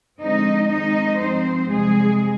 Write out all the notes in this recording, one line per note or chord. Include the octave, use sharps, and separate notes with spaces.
F2 D3 G#3 C4 D#4 D#5
F2 D#3 G#3 C4 D#4 D#5
G2 F3 G#3 C4 C5
F2 C3 G3 G#3 G#4